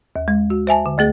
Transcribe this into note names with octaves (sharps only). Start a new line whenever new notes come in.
D#2
G#3
F#4
C5 E5 G#5 A5
D3
D2 A3 G#4 A6